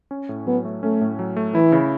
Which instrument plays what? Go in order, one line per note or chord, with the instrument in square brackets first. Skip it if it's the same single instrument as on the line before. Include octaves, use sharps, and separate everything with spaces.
[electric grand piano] C#4
A2
[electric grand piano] F#3 [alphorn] B3
[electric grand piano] A3
[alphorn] A3 [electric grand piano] C#4
[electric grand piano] A2
F#3
A3
[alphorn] E3 [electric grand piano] E4
[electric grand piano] C#3